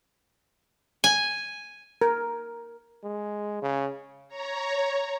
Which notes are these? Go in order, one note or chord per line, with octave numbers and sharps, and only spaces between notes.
G#5
A#4
G#3
C#3
C#5 A#5